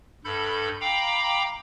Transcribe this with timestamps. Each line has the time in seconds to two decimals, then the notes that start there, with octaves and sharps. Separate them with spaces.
0.25 G2 A4 B5 G6
0.81 F5 G5 A#5 B5 D6